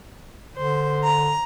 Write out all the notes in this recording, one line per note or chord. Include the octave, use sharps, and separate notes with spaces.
D3 C5
A#5